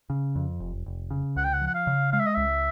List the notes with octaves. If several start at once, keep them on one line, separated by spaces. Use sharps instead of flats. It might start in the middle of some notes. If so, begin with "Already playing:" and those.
C#3
F2
F1
F1
C#3
C#2 F#5
G5
F#5
F3
F#5
F5
C#3
G#3 F5
E5
D#5
C#2 E5